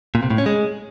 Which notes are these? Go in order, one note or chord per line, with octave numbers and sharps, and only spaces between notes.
A#2
C3
A2
C#4
G#3